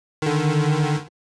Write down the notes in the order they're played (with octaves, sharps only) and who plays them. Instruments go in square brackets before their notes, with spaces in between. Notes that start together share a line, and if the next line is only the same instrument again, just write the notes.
[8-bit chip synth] D3 D#3